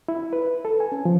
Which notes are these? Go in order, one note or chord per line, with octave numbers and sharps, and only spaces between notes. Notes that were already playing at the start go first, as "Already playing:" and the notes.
E4
B4
A4
G#5
C#4
F3